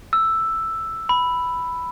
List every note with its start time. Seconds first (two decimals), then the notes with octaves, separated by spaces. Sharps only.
0.13 E6
1.09 B5